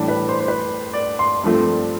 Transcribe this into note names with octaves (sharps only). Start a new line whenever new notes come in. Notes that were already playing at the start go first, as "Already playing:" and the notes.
Already playing: A2 E3 G3 D4
B4
C5
C5
B4
D5
C6
G2 F3 A3 C4